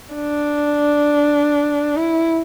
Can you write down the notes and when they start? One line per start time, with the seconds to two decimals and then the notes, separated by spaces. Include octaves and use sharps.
0.14 D4
1.97 E4